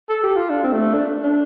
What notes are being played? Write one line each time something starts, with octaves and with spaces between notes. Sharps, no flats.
A4
G4
F4
D4
C4
A3
D4
D4